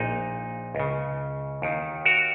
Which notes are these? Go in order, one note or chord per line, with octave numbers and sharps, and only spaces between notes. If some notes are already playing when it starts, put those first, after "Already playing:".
Already playing: A#1 A#2 D#4
C#2 C#3
D#2 D#3
F#4 A#4